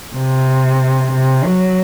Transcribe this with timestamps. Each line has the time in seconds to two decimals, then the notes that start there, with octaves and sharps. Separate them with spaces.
0.16 C3
1.13 C3
1.45 F#3